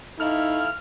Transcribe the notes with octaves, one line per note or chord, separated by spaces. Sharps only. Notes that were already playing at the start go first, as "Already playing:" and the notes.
D#4 E4 A4 F5 F6